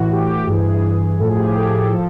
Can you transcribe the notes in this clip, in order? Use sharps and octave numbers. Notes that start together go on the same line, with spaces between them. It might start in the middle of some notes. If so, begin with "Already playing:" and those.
Already playing: A2 E3 F#4
G4
G2 E3 G#4
A2 F3 A4
G#4
G4
G#4
A4
F3